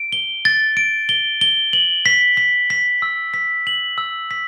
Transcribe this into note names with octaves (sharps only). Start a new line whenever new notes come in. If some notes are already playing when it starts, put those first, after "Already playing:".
Already playing: D7
G7
A6
D7
G7
G7
F#7
B6
B6
B6
E6
B6
F#7
E6
B6